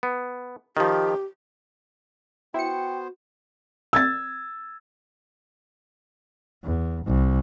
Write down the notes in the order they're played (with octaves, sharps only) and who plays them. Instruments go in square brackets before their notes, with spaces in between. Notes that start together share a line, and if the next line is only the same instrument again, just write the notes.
[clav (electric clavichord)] B3
[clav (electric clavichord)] D#3 F3 [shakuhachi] G4
[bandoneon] B3 C5 [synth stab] E4 C#7 [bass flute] F#4 [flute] G5
[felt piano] E6 G#6 A6
[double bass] E2
C2